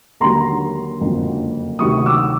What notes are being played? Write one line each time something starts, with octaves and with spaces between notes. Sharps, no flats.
D#2 D3 F#3 A#5 C6
F#1 F2 D3 F#3
D2 C3 D#3 F#3 C#6 D#6
D6 E6